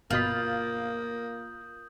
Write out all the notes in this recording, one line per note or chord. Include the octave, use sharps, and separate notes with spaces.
G1 B2 A#3 F4 B5 D#6 G6 F#7